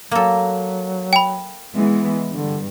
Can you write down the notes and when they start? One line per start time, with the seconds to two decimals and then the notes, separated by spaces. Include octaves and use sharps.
0.11 F#3 A#3 A4
1.13 G5 B5
1.75 E3 G#3 B3
2.31 G2 D3